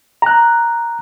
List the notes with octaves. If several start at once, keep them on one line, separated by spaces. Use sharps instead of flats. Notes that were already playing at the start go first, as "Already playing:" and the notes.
A#5 F#6